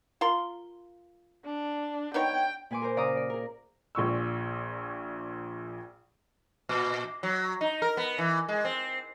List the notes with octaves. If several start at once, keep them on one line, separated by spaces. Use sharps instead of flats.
F4 A#4 C6
D4
B3 D#4 C#5 G5
A#2 B4 G#5 C6 D6
A#4 C5
C#3 D5 F5 A#5 D6 D#6
D5
G#4 A#4
A#1 A#2 C#6 E6
A#2
F#3
D#4
A#4
B3
E3
G#3
C4